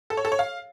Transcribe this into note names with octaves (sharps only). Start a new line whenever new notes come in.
A4
C#5
A4
C#5
F5